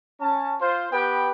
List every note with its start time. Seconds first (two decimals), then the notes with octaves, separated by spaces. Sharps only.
0.20 C#4 A5
0.60 F4 C5
0.92 B3 G4 B4 G5